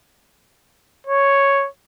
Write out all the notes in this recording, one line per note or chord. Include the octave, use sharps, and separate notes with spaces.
C#5